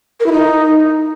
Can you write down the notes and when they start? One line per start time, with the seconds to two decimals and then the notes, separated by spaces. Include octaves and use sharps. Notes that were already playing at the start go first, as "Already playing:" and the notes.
0.20 A#4
0.26 E4
0.32 D#4